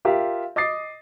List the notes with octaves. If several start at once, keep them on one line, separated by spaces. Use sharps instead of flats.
F4 G4 A#4 E5 F5
D#5 D6 D#6 A6 C7